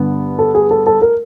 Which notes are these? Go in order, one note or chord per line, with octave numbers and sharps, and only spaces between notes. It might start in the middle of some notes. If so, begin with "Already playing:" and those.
Already playing: G2 D3 B3
A4
G#4
A4
A4
A#4